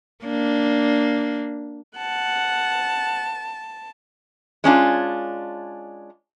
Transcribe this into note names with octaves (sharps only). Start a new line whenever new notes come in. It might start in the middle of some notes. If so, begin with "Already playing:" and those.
A#3 D4
F#5 A5
G#3 C#4 D4 F4